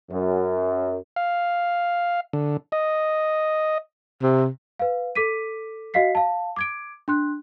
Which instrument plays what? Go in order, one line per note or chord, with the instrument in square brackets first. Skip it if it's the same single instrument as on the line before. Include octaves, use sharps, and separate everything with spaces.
[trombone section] F#2
[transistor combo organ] F5
D3
D#5
[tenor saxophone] C3
[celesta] B4 F5
A4 D6 B6 D#7
F#4 D#5 F5 B6 C7
F5 A5
D6 G#6 D7
D4 C6 F#6